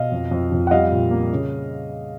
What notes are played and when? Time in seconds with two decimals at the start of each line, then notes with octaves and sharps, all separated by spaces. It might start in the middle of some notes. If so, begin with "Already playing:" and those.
Already playing: B2 D#5 F5
0.12 F2
0.31 F2
0.52 F2
0.67 F#5
0.71 G3 D#5 F5
0.91 A#2
1.11 A#3
1.32 C#3